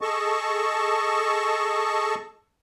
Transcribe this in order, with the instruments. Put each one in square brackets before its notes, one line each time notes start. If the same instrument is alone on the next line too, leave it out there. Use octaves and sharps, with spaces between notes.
[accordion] G#4 A4 D#5 A5 C#6